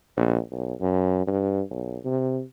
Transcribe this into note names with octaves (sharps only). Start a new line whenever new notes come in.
A#1
B1
F#2
G2
B1
C3